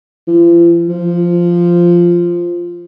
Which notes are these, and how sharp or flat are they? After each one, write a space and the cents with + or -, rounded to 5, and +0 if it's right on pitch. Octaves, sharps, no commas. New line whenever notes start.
F3 -45
F3 -5